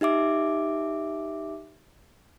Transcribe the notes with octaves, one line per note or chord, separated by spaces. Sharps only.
D#4 G4 E5 D6